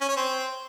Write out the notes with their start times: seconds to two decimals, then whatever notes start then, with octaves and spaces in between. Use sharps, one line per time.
0.01 C#4
0.09 C#5
0.17 C4